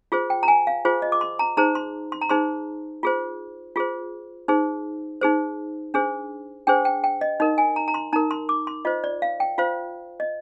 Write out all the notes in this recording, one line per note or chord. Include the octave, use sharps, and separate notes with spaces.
F4 G#4 C5
G5
A#5
G#5
F5
F4 G#4 C5
D#5
D6
C6
A#5
D#4 G#4 C5 A#5
C6
C6
A#5
D#4 G#4 C5 C6
F4 G#4 C5
F4 G#4 C5
D#4 G#4 C5
D#4 G#4 C5
D4 G#4 C5
D4 G#4 C5 G5
G5
G5
D#5
D#4 A#4 D#5
G#5
A#5
A#5
C6
D#4 A#4 A#5
C6
D6
C6
F4 C5 D#5
D5
F5
G5
F4 C5 F5
D#5